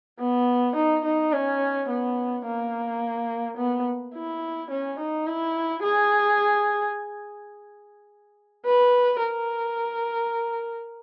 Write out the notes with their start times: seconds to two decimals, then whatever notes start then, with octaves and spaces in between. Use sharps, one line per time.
0.20 B3
0.75 D#4
1.05 D#4
1.33 C#4
1.89 B3
2.46 A#3
3.58 B3
4.14 E4
4.71 C#4
4.99 D#4
5.27 E4
5.83 G#4
8.66 B4
9.22 A#4